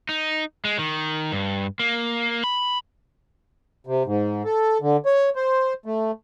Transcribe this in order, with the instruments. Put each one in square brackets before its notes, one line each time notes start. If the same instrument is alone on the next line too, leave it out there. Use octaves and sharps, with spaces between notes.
[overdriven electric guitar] D#4
G#3
D#3
G2
A#3
B5
[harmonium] C3
G#2
A4
D3
C#5
C5
A3